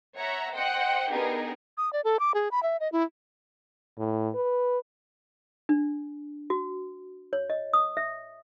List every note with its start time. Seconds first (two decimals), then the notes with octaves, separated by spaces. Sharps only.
0.19 C#5 E5 F#5 A#5
0.55 C5 D#5 F#5 G5
1.11 B3 D4 D#4 G4 G#4 A#4
1.77 D#6
1.93 D5
2.04 A4
2.20 D6
2.34 G#4
2.51 B5
2.63 E5
2.80 D#5
2.92 E4
3.98 A2
4.35 B4
5.69 D4
6.50 F#4
7.33 C#5
7.50 D#5
7.73 D#6
7.97 E5